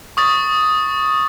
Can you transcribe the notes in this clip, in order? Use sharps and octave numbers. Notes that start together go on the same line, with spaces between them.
C#6 D#6 A6